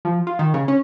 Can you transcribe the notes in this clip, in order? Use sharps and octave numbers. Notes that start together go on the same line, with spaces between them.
F3
F4
D#3
C#3
C#4